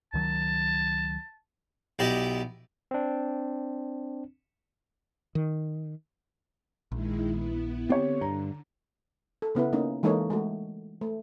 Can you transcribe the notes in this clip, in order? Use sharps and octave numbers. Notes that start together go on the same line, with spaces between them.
C#2 D#3 F#3 A5
B1 E4 G4 D5 D#5
C4 D4
D#3
A#1 D#3 G#3 E4
B3 E4
D3 B3 C4 G4 C#5
G2 A#5
A4
C#3 B3 E4 B4
A#3 C#4 D#4
E3 G#3 A#3 D#4 A4 C#5
G#3 A3 F#4
A3